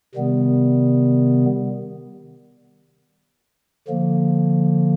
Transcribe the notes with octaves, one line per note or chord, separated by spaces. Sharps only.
C3 D#3 G3 B3
D3 F3 A#3